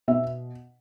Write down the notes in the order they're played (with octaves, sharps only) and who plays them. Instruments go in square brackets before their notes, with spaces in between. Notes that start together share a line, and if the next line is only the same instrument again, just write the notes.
[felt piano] B2 E5